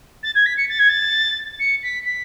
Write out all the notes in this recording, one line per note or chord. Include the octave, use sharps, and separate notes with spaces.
A6
G#6
B6
C#7
A6
G#6
A6
C#7
B6
B6